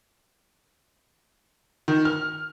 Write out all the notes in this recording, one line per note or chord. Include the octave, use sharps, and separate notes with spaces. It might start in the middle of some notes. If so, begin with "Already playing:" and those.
D#3
F6